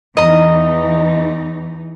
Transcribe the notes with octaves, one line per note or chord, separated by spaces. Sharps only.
E2 E3 D#4 D#5 A#5